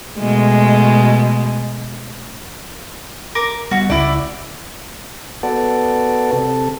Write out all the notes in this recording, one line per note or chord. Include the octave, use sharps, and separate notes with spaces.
B2 G#3 A3
A#4 D6
G3 B3 F#4
C#2 E4 D5
B3 F#4 A4 D5
C3 A4